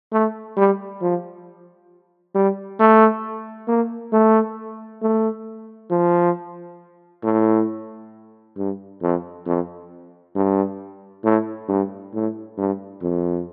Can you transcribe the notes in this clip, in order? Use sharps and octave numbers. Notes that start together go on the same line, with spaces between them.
A3
G3
F3
G3
A3
A#3
A3
A3
F3
A2
G2
F2
F2
G2
A2
G2
A2
G2
F2